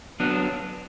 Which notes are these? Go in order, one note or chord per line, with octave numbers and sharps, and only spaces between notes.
F#3 B3 D4